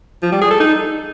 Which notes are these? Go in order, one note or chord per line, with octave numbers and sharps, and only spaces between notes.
F3
G3
G#4
A4
D#4